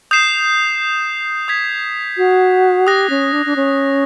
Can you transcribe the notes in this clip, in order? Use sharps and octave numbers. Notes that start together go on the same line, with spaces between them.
D#6 G6 C7 E7
D#6 G#6 B6
F#4
G4 D#6 F#6 A#6
C#4
D4
D4
C#4